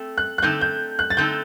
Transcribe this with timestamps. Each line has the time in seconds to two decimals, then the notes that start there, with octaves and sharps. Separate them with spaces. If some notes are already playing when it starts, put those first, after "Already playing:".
Already playing: A3 C4 A4
0.18 F#6
0.38 F#6
0.42 D3 A3 C4 D#4 A4 G6
0.61 G6
0.99 F#6
1.10 A6
1.17 D3 A3 C4 D#4 A4 G6